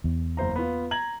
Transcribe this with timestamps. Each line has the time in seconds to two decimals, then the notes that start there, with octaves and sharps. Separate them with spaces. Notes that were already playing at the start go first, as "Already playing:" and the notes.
0.04 E2
0.37 F#1 C5 A#5
0.56 B3 F4
0.91 A#5 G#6 F#7